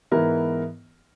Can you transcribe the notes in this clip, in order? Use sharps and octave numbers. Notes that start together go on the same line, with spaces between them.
G#2 E3 B3 E4 A#4